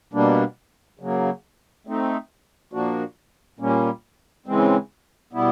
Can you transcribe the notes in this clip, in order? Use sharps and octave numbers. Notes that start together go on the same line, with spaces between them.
B2 G3 A#3 D4
C#3 F#3 A#3
A3 C4 D#4
A#2 F3 A#3 D4 F#4
A#2 G3 A#3 C#4
C#3 E3 G#3 C4
B2 G3 B3 E4